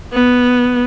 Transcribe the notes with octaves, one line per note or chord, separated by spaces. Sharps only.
B3